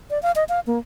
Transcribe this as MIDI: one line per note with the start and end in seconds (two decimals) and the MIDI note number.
0.10 0.21 74
0.23 0.32 77
0.36 0.44 75
0.49 0.60 77
0.67 0.79 58